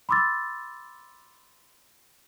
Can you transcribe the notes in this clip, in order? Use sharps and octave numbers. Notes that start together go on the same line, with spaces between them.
B5 C6 D6 E6 A6